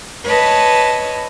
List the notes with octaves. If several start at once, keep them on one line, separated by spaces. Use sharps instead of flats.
B4 C#5 D#5 A5